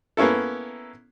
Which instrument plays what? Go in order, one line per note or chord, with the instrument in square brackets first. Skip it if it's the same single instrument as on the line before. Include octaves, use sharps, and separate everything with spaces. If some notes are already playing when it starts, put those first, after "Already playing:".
[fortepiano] A#3 B3 C#4 E4 A4